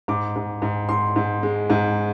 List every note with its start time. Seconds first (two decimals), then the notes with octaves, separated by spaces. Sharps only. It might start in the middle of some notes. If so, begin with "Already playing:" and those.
0.08 G#2 D6
0.36 G#2
0.62 G#2
0.89 G#2 C6
1.16 G#2
1.43 G#3
1.70 G#2